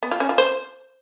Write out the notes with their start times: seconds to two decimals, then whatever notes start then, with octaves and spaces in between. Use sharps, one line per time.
0.03 B3
0.11 F4
0.20 C#4
0.29 F4
0.38 C5